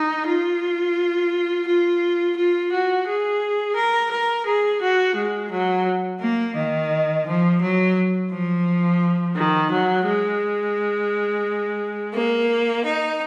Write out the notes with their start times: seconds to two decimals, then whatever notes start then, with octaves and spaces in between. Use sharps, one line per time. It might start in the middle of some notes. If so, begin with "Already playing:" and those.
Already playing: D#4
0.26 F4
1.66 F4
2.35 F4
2.71 F#4
3.06 G#4
3.75 A#4
4.10 A#4
4.45 G#4
4.80 F#4
5.15 G#3
5.50 F#3
6.21 A#3
6.55 D#3
7.25 F3
7.60 F#3
8.31 F3
9.36 D#3
9.71 F#3
10.05 G#3
12.15 A#3
12.85 D#4